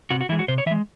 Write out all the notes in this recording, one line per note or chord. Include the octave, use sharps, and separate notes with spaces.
C3 F#4
F#4
E3 G#3 E4
F#4
C3 C5
C#5
E3 G#3 E5